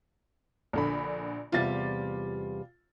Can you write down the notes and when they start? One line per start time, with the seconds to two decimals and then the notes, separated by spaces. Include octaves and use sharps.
0.73 A#1 D3 B5
1.52 E2 C3 G3 F4 A6